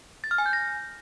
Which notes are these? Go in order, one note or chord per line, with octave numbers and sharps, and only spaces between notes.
A6
F6
G#5
G6
A#6